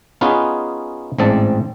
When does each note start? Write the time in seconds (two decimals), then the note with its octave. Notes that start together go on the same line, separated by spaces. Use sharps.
0.21 B3 C#4 D#4 F4 G#4 B4
1.19 A1 G#2 C4 D5 A5